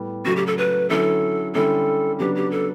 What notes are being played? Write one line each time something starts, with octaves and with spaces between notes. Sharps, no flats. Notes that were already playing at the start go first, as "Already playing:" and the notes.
Already playing: A2 G3 B3
C#3 F#3 A3 F#4
G4
A4
B4
D3 F#3 C#4 E4 A4
D3 G3 C#4 E4 A4
C#3 F#3 B3 D4 G4
G4
A4